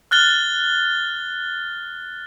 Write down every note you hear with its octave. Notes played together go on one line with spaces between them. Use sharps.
F6 F#6 A6 G7